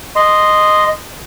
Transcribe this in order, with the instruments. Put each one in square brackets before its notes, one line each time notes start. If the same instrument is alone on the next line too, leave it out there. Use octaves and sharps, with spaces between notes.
[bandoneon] D#5 C6